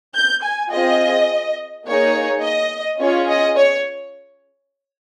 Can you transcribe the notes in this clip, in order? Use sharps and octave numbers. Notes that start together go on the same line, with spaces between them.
G6
G#5
C4 F4 G#4 D#5
A#3 D#4 G#4 C#5
D#5
C#4 F4 G#4 C#5
D#5
C#5